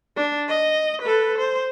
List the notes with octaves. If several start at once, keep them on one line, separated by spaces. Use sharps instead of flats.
D4
D#5
A4 B4
C5